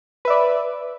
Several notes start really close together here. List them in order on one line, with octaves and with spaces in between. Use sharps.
B4 E5 D5